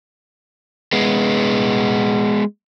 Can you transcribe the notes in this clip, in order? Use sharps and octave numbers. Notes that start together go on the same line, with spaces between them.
G#3 B3